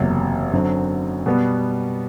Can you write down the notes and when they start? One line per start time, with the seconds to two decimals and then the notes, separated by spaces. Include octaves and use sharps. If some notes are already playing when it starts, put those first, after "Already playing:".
Already playing: F#1 E2 C3 F#3
0.53 F#2 D3 F#3 C4
1.26 B2 G3 B3